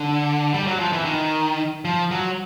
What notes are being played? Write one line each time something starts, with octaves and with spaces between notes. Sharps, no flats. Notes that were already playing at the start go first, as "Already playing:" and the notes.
Already playing: D3
G3
F#3
F3
E3
D#3
F3
F#3